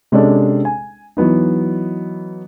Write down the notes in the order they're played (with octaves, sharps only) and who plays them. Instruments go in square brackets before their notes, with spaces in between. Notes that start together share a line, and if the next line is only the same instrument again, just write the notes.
[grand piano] C3 G#3 C#4 D4 G#4 A4
G#5
E3 F#3 B3 D#4